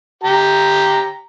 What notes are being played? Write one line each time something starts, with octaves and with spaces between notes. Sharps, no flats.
G4 A#5